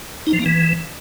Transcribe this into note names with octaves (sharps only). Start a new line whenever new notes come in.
D#4
F3
A#3
E3